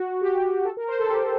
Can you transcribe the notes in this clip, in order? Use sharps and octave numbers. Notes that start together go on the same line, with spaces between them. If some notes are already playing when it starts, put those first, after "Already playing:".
Already playing: F#4
G4
A4
A#4
C5
A4
G4